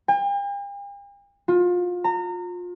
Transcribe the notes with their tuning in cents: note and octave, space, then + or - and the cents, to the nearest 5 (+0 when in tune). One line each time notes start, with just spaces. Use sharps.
G5 +45
F4 +30
A#5 -30